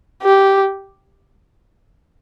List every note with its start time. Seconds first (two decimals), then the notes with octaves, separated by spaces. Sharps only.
0.23 G4